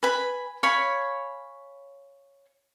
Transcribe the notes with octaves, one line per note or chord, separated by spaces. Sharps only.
B4 G#5 B5
C#5 F5 G#5 B5